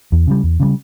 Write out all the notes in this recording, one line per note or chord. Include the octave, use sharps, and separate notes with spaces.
E2
C#3 E3 G3
E2
C#3 E3 G3